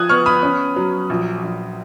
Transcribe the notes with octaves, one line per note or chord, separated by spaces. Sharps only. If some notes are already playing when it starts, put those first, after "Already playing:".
Already playing: F3 D#6 F#6 G#6
B3 C#6 F6
B5 D#6
C#4
F#3
A#1
A#1